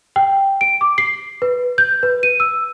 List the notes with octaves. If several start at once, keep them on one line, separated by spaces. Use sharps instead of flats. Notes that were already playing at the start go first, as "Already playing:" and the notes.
G5
D7
D6
C7
B4
G6
B4
D#7
E6